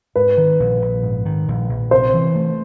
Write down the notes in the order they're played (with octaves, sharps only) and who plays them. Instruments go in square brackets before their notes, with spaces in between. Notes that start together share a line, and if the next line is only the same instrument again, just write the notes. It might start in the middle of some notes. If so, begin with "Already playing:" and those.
[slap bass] G#2 [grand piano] B4
[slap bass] D#3
A#1
A#1
G#2
D#3
A#1
A#1
[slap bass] C3 [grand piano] C5
[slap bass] E3
A3